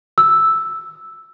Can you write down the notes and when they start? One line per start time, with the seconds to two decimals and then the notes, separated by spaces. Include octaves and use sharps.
0.18 E6